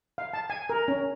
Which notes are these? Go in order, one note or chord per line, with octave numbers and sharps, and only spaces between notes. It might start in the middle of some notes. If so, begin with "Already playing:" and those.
F5
A5
G#5
A#4
C#4